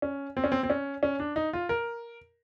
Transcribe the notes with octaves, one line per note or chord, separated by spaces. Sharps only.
C#4
C4
C#4
C4
C4
C#4
C#4
D4
D#4
F4
A#4